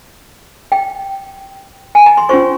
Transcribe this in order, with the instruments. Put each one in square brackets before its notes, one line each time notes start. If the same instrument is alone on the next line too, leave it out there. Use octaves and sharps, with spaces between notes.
[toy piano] G5
G#5
A#5
C6
C#4 F4 C5 C#6